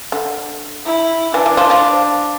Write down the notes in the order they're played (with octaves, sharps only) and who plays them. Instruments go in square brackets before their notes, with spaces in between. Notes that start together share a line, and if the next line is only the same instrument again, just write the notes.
[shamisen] D3
[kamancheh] E4
[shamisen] E3 [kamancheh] D4
[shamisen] E3
F3
F3